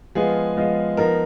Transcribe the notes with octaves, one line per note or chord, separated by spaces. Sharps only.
F3 G#3 B3 F4 G#4
F3 G#3 B3 F4
F3 B3 D#4 A#4